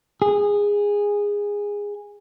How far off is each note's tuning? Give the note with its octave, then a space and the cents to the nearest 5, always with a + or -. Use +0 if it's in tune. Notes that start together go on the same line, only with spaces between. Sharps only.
G#4 -15